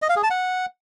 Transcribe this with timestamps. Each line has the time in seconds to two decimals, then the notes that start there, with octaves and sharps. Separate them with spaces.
0.02 D#5
0.09 F5
0.16 G#4
0.23 A5
0.30 F#5